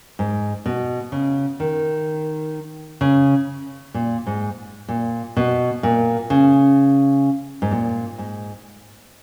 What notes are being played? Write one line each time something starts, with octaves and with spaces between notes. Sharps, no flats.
G#2
B2
C#3
D#3
C#3
A#2
G#2
A#2
B2
A#2
C#3
G#2
A#2
G#2